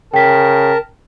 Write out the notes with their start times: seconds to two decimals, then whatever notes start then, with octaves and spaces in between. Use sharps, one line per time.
0.14 C#3 A#4 G5 A5 B6